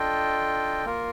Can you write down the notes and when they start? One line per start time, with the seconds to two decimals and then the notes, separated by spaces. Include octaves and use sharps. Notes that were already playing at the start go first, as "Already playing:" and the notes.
Already playing: D4 F4 A4 D#5 G5
0.85 A#3 F4 A#4